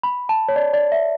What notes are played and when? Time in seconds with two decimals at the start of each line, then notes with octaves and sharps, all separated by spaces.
0.03 B5
0.29 A5
0.48 C#5
0.56 D5
0.73 D5
0.92 E5